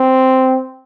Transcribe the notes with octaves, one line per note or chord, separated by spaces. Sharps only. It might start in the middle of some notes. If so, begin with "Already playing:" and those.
Already playing: C4